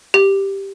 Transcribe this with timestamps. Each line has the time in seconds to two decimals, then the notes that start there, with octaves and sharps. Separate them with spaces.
0.14 G4